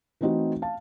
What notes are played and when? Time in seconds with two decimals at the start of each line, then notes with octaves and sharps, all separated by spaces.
0.21 E3 A3 C4 D#4 E4 F#4
0.62 F5 A5